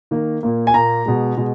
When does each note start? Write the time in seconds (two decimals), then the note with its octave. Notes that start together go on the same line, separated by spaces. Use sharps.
0.11 D#3 A#3
0.43 A#2 A#3
0.67 G#5
0.74 A#2 A#3 A#5
1.06 B2 G#3
1.37 B2 G#3